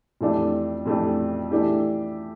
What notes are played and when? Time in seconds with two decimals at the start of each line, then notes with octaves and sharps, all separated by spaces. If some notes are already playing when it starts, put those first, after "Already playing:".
0.21 F2 E3 A3 D4 G4
0.86 F2 E3 A3 D4 G4
1.51 E3 A3 D4 G4